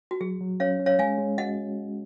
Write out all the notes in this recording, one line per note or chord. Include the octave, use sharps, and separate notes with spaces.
F#4
F#3 G#4
F#3
C#4 C#5 F5
C#4
C#5 F5
G#3 F5 G#5
G#3
F#4 D#5 F#5